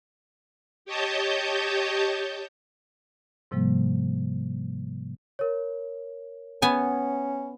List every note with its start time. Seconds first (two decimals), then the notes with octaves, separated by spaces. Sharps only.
0.85 G4 C#5 D#5 A5 G6
3.51 G#2 C3 F3 G3 A#3
5.39 A#4 C#5
6.62 B3 C#4 G#5